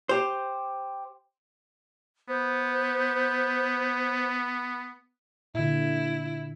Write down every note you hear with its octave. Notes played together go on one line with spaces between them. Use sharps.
G4 C5
B3 C5
A#2 D3 E4